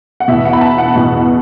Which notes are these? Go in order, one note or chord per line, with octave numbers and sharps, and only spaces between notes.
F#5
E2 B2 E5
F#5
B5
A5
F#5
E2 B2